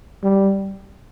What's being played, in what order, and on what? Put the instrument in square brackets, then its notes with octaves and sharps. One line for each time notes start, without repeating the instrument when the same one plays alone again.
[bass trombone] G3